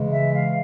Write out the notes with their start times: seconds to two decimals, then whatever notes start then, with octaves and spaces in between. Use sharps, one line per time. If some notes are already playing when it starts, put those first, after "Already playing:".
Already playing: C#3 E3 G#3
0.13 E5
0.34 F5